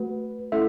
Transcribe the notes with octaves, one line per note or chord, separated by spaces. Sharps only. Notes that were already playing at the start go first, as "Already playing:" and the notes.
Already playing: A3 F#4 B4
A3 C#4 E4 A4 E5